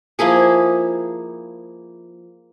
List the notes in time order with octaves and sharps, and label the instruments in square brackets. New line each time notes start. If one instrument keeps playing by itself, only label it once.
[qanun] F3 A#3 E4 G#4